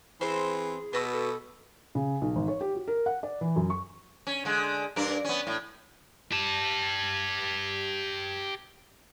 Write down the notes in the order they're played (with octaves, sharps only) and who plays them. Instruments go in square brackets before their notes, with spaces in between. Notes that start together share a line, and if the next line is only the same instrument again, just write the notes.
[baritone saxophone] E3 [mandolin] C4 C5 [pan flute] G#4
[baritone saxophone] B2 [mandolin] B3 F#4 E6
[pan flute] A4
[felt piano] C#3
B1
G#1
C#5
G4
F#4
A#4
F#5
D5
E3
F#2
C#6
[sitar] C#4
D3 G#3
G2 D4 A#4
B3 C#4
A2
[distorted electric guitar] G4 A5